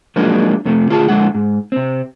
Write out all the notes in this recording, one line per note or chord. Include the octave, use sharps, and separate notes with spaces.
F3 F#3 G#3 A#3 D4 D#4
F2 C3 A3
D2 F4 G#4 A5
F2 D3 D#3 G#3 C4 F#5
G#2
C3 C4